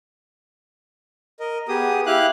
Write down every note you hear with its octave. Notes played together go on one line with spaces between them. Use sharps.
A#4 D#5
B3 G4 G#4 D#6
E4 G4 F5 F#6